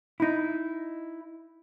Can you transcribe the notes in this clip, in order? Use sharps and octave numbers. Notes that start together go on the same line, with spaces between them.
D#4 E4